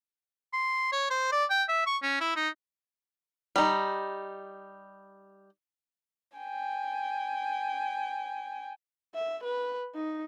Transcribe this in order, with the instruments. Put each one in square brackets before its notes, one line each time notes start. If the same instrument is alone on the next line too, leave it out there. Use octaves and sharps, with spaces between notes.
[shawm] C6
C#5
C5
D5
G5
E5
C#6
C#4
E4
D#4
[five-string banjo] G3 D#4
[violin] G5 G#5
[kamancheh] E5
B4
D#4